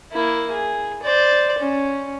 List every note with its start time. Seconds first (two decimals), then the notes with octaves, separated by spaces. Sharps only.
0.12 A#3 E4
0.52 G#4
1.02 C5 D5
1.58 C#4